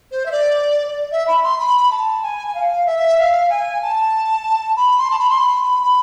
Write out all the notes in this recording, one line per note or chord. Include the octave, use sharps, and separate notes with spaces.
C5
E5
D5
E5
B5
C6
B5
A5
G#5
G#5
F5
E5
F5
G#5
A5
B5
C6
A5
B5
C6
B5
B5
B5